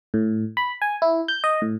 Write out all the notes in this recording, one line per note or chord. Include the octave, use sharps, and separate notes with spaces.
A2
B5
G#5
E4
G6
D#5
A2